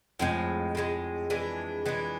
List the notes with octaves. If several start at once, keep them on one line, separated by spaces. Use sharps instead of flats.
F2 A2 F3 G#3
A2 F3 G#3
E3 G#3 D4
E3 G#3 D4